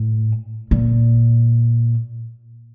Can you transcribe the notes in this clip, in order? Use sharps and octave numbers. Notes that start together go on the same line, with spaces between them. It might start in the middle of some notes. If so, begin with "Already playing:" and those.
Already playing: A2
A#2